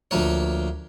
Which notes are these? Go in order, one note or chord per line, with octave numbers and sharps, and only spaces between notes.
D2 F3 A#3 C#5